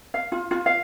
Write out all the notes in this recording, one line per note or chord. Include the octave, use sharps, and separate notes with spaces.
F5
F4
F4
F5